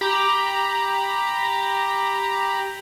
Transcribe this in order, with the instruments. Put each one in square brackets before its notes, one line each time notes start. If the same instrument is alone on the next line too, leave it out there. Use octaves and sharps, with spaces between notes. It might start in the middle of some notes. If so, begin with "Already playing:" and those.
[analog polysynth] G4 A#5 B5